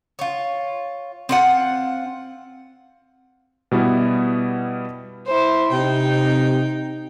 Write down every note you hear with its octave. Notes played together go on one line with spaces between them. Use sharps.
F4 C#5
C4 F4 F#5
B2 G3 B3 E4
E4 C5
C3 D#4 G5